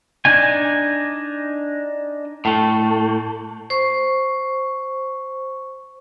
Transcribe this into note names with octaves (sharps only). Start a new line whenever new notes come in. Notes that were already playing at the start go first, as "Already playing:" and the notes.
D4 D#4 G#5
A2 A3
C5 C#6